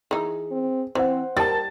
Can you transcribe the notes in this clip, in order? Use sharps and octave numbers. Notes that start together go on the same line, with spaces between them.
E3 D#4 G#4
C4
E3 C4 C5 F#5
G3 A#4 A5 A6